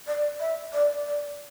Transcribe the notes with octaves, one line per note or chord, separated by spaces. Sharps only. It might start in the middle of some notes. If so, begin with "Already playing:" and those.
D5
E5
D5
D5